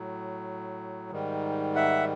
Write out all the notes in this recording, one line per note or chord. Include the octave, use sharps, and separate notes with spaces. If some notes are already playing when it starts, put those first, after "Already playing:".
Already playing: A2 F#3
G#2 D#3 G3
E5 F#5